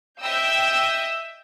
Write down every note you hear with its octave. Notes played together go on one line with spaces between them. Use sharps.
D#5 E5 G5 E6 G6